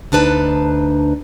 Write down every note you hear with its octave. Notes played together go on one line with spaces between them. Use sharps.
D2 D4 D#4 B4 A5